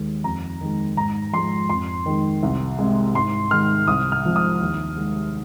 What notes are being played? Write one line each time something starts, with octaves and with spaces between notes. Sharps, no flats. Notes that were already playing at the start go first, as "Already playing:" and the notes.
Already playing: D#2 D#3 G#3
F2 A#5
D#3 G#3
G#2 A#5
F3 G#3 C6
F2 C6
D#3 G#3
C2
C3 G#3
G#2 C6
D#3 G#3 F6
C2 D#6
F6
C3 F3 G#3
D#6
D#2
D#3 G#3